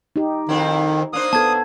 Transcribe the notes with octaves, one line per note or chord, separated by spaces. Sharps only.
D#4 G4
F2 D#3 C4 E4
A#3 D4 C5 D#6
B3 A4 A5 G#6